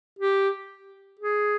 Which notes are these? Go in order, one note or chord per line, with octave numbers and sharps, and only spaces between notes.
G4
G#4